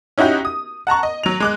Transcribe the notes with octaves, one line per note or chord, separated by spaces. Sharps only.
C#4 D#4 E4 F#4 G4
D#6
F#5 A5 A#5 C#6
D#5
F#3 F7
G#3 D6 F#6